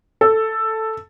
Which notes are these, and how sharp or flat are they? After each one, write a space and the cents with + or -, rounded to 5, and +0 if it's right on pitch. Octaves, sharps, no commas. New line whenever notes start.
A4 +5